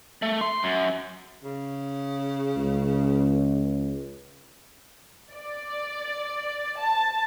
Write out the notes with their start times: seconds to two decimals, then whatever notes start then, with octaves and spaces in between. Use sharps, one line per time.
0.22 A3
0.41 C6
0.63 F#2
1.44 C#3
2.57 C#2
5.32 D5
6.79 A5